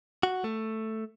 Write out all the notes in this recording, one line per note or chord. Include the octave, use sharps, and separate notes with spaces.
F#4
A3